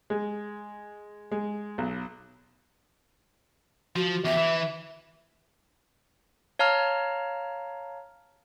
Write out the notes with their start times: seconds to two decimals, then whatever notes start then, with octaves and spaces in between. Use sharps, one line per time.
0.10 G#3
1.32 G#3
1.78 B1
3.96 F3 F#4
4.25 E2 G4 E5
4.37 E3
6.59 C#5 F5 A5 A#5 F6